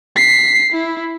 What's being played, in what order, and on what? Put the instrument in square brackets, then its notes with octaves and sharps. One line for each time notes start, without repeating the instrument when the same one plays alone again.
[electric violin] B6 C7
E4